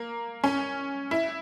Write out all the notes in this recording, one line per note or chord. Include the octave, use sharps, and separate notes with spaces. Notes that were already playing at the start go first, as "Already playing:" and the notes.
Already playing: A#3
C#4
E4